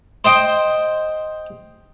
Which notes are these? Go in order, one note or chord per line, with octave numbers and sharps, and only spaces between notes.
C5 D#5 G5